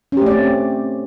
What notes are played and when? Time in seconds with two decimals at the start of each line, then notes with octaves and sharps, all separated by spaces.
0.12 C#4
0.17 G4
0.22 A3
0.26 D5
0.31 C4